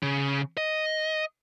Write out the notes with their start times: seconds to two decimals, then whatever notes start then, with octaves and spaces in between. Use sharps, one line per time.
0.03 C#3
0.57 D#5